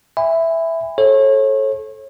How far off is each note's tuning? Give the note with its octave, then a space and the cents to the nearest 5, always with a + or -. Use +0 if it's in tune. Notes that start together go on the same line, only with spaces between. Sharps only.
E5 +0 G#5 -35 B5 +20
A4 -20 C#5 -35